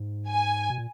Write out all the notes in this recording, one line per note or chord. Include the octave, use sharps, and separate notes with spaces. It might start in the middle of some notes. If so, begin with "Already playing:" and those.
Already playing: G#2
G#5
B2
A#2